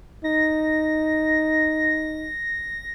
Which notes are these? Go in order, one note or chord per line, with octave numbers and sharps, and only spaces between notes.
D#4 A#6